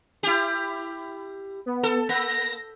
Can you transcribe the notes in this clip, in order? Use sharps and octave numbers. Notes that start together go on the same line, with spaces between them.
E4 G4
B3
A4
A#3 A#6